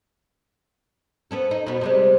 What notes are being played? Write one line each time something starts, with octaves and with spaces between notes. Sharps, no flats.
B3 C#4 A4
D#4
B2 B3
C3 G3 G#3